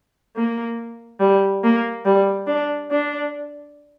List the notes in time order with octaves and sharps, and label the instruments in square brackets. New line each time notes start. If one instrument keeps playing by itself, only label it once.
[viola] A#3
G3
A#3
G3
D4
D4